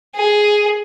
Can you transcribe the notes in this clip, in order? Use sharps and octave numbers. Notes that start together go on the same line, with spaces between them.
G#4